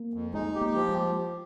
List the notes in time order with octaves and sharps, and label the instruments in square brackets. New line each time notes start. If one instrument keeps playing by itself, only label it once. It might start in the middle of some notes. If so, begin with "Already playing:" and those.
Already playing: [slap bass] A#3
[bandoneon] F2
[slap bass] G#3 [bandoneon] D#4
[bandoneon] G4
[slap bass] A#3
[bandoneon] F3
[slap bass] G#3